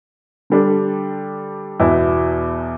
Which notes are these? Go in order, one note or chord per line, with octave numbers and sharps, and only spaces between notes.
D3 G3 D4 A4
E2 B2 B3 E4